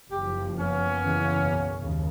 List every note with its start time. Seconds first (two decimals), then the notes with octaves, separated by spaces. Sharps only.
0.10 F#1 F#2 F3 G4
0.58 A#3 B3 C#4
1.03 F#1 C#3 E3
1.39 B1 E2
1.78 D#2 G#2 C#3